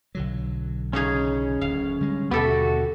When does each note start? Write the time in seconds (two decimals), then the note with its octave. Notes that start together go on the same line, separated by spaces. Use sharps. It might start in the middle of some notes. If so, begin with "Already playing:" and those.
0.15 B1 D3 F#3
0.93 C#3 C#4 D#4 G#4
1.61 D1 F5
2.00 D3 G3 G#3
2.31 D#2 B2 D3 B3 G4 A4 E5
2.44 F#4